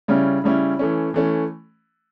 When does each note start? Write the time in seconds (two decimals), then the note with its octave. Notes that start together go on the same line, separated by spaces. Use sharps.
0.08 C#3 G3 C#4 E4
0.44 C#3 G3 C#4 E4
0.79 E3 A3 C#4
1.14 E3 A3 C#4